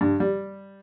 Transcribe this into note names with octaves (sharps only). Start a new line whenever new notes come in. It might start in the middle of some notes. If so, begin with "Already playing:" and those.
G2
G3